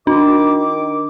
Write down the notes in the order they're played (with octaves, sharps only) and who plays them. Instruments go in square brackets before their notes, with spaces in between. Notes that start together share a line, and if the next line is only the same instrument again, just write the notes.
[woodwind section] D#3 D6 [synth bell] D4